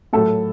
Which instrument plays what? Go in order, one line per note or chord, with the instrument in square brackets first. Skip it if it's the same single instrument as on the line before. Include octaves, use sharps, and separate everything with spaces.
[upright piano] A2 F#3 A4